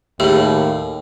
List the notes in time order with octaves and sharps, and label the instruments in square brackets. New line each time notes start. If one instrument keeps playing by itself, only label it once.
[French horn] D#2 [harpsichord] A2 [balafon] G4 G#4